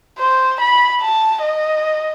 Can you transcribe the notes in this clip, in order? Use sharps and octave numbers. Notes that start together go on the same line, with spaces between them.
C5
B5
A5
D#5